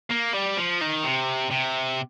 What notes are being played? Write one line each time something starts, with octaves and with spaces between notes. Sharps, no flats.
A#3
G3
F3
D#3
C3
C3